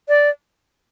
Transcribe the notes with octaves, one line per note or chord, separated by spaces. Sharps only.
D5